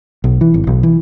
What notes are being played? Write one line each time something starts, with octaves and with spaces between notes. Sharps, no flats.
B1
E3
G#1
B1
E3